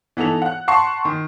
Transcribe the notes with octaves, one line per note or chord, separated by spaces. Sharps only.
E3 B3 D#4 A4 F7
F#5 F#6
F#5 A5 C6 C#6 C7
D#3